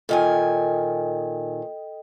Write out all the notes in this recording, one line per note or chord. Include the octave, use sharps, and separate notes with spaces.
A#2 D#3 A4 D#5 G5 G#5